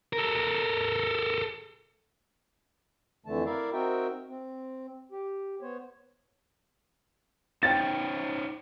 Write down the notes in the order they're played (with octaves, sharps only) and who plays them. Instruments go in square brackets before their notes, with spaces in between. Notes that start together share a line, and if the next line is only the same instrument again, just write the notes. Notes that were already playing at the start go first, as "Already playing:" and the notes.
[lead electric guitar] A4 A#4
[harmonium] F2 D3 E3 A3 A5
E4 A#4 D5 E5 F5
C4 D#4 F#4 A#4 E5 G5
C4
G4
B3 C5 C#5
[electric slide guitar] D#4 C5 C#5 [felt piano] G5 A6